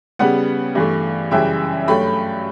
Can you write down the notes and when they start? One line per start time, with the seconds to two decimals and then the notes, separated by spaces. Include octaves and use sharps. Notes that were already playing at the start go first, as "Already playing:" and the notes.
0.19 C#3 G3 B3 F#5
0.75 G2 E3 A3
1.31 F#2 C#3 E3 G3 E5 G5
1.88 G2 F#3 A3 G5 B5